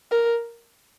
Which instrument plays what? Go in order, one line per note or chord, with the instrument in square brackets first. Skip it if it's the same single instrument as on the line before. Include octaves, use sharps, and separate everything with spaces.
[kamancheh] A#4